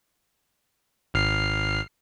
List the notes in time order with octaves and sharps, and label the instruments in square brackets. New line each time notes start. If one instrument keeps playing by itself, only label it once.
[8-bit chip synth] G#1 F6 C7